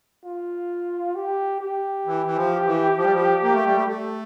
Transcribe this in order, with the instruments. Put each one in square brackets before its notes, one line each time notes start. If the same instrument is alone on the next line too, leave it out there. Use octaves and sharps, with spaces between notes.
[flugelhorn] F4
G4
G4
[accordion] E3
E3
F3
E3
F3
G3
F3
A#3
A3
G3
A3
[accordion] A3 [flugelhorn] A4